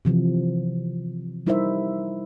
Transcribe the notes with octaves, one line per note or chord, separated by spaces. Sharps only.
C3 E3 F3
G3 D#4 E4 A#4 C5 E5